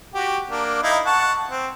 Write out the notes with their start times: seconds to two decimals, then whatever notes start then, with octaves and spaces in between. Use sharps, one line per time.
0.14 F#4 G4
0.49 A#3 D4
0.83 D#4 E4 F5
1.06 F#5 A5 C#6
1.49 C4